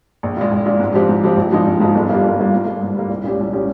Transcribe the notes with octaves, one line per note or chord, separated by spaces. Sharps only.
A#1
A#2 G#3
A#1
A#2 G#3
G#2
F3 G#3 C4 G4
G#2
F3 G#3 C4 G4
A#1
G#2 F3 G#3 D#4
A#1
G#2 F3 G#3 D#4
G1
G2 G3 A#3 F4
G1
G2 G3 A#3 F4
G#2
G3 A#3
G#2
G3 A#3
C2
A#2 G#3 C#4 G4
C2
A#2 G#3 C#4 G4